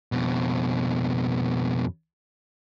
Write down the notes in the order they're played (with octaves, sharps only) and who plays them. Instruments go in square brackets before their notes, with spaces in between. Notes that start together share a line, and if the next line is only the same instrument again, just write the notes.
[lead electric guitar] F2 B2